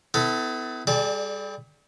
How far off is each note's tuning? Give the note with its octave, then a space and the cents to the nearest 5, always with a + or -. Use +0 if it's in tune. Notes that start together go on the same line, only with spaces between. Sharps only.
B3 +35 E4 -20 A4 +10
G3 +25 A4 -45 D5 +0